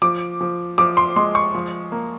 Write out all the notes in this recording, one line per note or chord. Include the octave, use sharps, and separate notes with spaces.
F3 D6
F3
F3 D6
C6
G#3 C6
C#6
F3
A#3